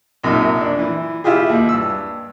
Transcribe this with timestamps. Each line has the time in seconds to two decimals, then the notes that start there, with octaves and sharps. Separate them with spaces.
0.23 A#1 F#2 C3 D#4
0.61 D4
0.79 E3
1.24 E4 F4 G4 G#4
1.49 D#2
1.69 G2 E6